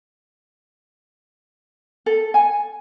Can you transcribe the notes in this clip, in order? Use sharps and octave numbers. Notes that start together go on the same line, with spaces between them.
A4
G#5